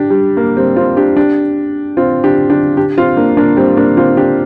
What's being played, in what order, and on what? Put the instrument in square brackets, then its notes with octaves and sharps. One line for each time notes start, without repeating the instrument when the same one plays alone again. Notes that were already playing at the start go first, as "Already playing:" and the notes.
Already playing: [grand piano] D4 G4
G3
A#3
G3 C4
C4 F4
D4 G4
D4 G4
C4 F4
D4 G4
D4 G4
D4 G4
C4 F4
A#3 D4
A#3 D4
G3 C4
A#3 D4
C4 F4
D4 G4